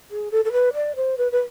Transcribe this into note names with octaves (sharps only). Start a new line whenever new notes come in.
G#4
A4
A4
B4
D5
C5
B4
B4